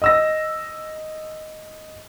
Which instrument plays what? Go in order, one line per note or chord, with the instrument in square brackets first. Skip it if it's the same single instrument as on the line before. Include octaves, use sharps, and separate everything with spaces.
[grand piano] D#5 E6 A#6